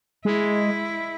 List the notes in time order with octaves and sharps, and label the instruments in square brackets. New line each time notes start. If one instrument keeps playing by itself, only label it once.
[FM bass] G#3 [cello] E4